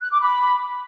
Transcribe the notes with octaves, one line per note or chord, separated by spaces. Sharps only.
F#6
D6
B5